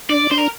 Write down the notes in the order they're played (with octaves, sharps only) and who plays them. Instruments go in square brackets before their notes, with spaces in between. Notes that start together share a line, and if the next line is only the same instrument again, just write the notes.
[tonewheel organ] D4 [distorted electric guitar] D5
[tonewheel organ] D4 [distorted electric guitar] C5
[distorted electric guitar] A#4